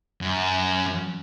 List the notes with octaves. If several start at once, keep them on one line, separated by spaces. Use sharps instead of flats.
F#2